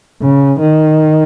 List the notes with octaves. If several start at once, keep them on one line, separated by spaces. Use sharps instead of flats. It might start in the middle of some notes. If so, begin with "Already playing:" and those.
C#3
D#3